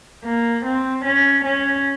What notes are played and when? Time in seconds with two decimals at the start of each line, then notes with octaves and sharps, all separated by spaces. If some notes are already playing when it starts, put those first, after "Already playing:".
0.25 A#3
0.66 C4
1.05 C#4
1.45 C#4